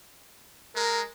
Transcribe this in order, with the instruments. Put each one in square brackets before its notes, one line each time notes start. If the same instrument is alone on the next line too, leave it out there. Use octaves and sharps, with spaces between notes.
[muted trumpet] G#3 [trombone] A#4